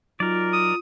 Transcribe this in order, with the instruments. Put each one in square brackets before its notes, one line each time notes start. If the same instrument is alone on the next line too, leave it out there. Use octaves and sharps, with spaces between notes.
[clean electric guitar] F#3 D#4 [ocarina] F4 [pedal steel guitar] A#4 D5
[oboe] D#6